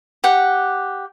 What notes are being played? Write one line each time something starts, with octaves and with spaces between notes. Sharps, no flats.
G4 F#5